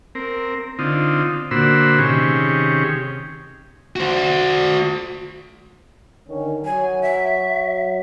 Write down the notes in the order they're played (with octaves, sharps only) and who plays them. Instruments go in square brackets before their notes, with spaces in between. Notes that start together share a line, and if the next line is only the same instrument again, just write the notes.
[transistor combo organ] C4 A#4
D3 C4 D#4 F4
A#2 D3 F#4 C5 B5 E6
C3 D#3 C#4 G4 G#4
[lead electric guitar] F#4 C5
[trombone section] D3 D#3 C#4
[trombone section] F#3 [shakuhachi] G#5
[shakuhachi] E5